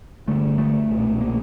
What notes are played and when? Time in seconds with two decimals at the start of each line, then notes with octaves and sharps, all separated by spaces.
0.27 G1 G2 D3 A3
0.58 A3
0.89 B1 A#2
1.21 A#3